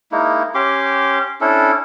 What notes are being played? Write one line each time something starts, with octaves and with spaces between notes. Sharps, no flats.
G#3 A#3 D#4 E4
C#4 G4 C6 D6
C#4 D4 E4 A4